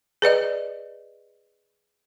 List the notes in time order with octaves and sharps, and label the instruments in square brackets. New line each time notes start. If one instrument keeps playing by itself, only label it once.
[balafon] G#4 B4 D5 D#5